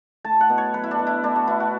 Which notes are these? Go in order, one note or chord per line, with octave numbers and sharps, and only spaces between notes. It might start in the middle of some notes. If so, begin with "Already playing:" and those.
A3 A5
F#5
B2
C#5
F#3 B4
E4
D4
B2
E4
A3 D4
F#4
B2 E4
F#4